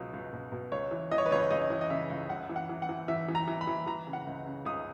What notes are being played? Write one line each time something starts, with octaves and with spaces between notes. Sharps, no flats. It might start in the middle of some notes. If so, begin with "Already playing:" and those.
Already playing: C#2 B2 F#3
C#2
B2
B2
C#2 C#5
E3
E3 D#5
C#5
B4
C#2 C#5
C#2 D#5
E3
D#5
C#3 E5
C#2
F#2 F#5
E3
F#5
E3
F#5
E3
E3 E5
E3
A#5
E3
B5
E3
E3 A#5
C#3
F#5
C#2
C#3
C#2 D#6